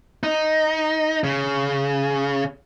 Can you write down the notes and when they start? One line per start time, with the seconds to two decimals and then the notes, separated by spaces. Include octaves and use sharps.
0.23 D#4
1.24 C#3